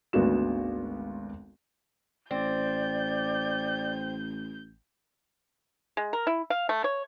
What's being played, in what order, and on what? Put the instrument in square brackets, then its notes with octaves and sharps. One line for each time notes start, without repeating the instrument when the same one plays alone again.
[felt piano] G#1 D2 B3 F#4 E7
[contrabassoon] A1 [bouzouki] C4 [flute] D5 [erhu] G6
[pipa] G#3
A#4
E4
F5
A3
C#5